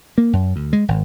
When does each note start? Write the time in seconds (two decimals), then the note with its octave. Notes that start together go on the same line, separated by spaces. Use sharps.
0.18 A#3
0.33 F#2
0.56 D2
0.73 G#3
0.88 G#1